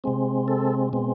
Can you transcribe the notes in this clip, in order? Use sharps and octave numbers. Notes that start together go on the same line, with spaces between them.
C3 G#3 C4
A4
B2 G#3 C4